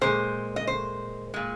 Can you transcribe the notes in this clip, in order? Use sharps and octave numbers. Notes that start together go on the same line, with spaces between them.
A#2 G#3 C5
D#5
C5
A#2 G#3